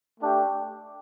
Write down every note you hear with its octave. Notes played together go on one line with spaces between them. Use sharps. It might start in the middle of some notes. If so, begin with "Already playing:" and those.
A3 D4 G4